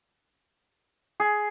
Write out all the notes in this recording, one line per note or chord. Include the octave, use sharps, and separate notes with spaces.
G#4